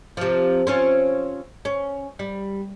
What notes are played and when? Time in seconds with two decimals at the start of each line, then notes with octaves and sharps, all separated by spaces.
0.17 C3 F3
0.67 C4 C#4 F4
1.65 C#4
2.19 G3